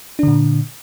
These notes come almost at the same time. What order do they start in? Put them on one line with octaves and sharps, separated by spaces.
D4 D3 A#2